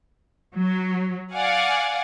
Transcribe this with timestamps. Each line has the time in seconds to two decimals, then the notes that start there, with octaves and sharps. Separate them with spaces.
0.55 F#3
1.33 D5 F5 F#5 G#5